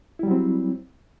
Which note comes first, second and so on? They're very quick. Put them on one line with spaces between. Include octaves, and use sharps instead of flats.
E4 G3 F#3 C4